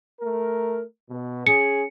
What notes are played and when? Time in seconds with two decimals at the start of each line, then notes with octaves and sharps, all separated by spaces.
0.21 A3 A#4
1.09 B2
1.47 C#4 G#4 C#7